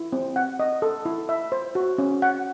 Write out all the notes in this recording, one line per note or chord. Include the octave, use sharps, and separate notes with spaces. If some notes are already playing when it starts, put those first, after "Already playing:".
Already playing: E4
C4
F#5
D#5
A4
E4
E5
C5
F#4
C#4
F#5